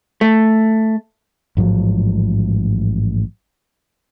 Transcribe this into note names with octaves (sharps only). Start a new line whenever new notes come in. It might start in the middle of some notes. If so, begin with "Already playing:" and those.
A3
A1 G#2 F3 F#3